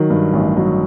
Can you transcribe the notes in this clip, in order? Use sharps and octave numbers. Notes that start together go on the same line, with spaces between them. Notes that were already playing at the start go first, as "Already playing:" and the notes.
Already playing: D#3 F#3
G2
A1
F#3